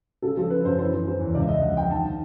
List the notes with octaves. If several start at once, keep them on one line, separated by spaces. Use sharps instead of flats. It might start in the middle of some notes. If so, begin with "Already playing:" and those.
C#3 A4
F3 A4
C#3 B4
F#2 C5
E3 C5
E3
E3 C5
E2
C#2 D5
E5
C#2 D#5
F3 F#5
F3 G5
D#3 A5
D#3